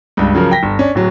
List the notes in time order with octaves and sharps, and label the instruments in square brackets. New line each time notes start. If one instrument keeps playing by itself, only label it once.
[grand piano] C#2 G2
C#3 F3 F#3 A#4
G5 A#6 B6
G1
C#4 D4
D1 F#3